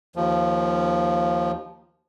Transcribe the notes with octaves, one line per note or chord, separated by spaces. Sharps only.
D#2 F3